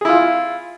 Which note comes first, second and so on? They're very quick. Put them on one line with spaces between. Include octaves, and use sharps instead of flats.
G#4 E4 F4